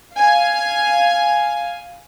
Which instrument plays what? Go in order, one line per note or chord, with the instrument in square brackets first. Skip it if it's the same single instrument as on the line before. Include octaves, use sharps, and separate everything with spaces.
[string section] F5 G#5